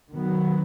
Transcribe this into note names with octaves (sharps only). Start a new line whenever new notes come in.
D#3 F#3 B3